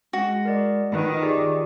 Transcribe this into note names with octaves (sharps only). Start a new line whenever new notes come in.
G#3 F#4
A#4 D5 D#5
D#3 F4 B4 B5
G4 G#4 D5